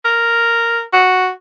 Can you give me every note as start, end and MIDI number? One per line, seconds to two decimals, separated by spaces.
0.05 0.81 70
0.93 1.29 66